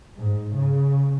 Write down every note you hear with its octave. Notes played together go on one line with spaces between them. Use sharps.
G#2
C#3